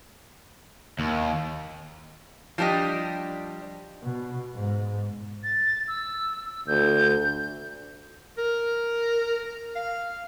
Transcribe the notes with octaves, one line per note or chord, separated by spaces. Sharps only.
D#2
F3 G3 D4 G4 D#5
B2
G#2
A6
E6
D2 G6
A#4
F5